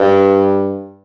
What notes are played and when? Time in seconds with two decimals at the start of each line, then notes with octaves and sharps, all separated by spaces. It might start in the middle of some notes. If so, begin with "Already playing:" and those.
Already playing: G2